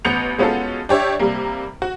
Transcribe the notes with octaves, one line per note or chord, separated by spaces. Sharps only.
A1 B3 G6 C#7 F7
G#3 B3 C#4 F4 F#4 A4
D4 G4 C#5 E5
C3 G3 A#3
F#4